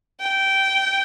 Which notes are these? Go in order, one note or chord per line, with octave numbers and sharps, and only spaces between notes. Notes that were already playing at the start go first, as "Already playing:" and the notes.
G5